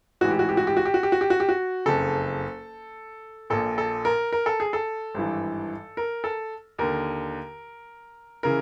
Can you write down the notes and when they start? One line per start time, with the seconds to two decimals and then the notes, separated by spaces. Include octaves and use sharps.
0.21 A1 G#2 E3 F#4
0.31 G4
0.39 F#4
0.49 G4
0.57 F#4
0.67 G4
0.77 F#4
0.85 G4
0.94 F#4
1.03 G4
1.12 F#4
1.21 G4
1.30 F#4
1.40 G4
1.49 F#4
1.86 F#1 F2 C#3 A4
3.50 A#1 A#2 A4
3.78 A4
4.05 A#4
4.32 A#4
4.46 A4
4.60 G#4
4.73 A4
5.14 G#1 G2 E3
5.97 A#4
6.24 A4
6.78 D#2 D3 A#4
8.43 C#3 E3 A#4